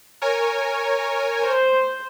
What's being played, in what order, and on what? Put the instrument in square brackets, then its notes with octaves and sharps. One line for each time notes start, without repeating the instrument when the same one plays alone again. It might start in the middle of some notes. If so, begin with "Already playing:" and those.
[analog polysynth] A#4 C#5 G#5
[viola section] C5